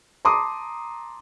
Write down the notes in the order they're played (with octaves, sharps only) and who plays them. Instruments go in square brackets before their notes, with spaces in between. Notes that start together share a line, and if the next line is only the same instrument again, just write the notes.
[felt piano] A5 A#5 C6 D6 D#6